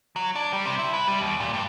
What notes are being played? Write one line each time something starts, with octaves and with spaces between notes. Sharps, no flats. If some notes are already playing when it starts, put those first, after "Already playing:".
F#3
D4
G3
C3
E4
B4
G3
D#2
A#2
G2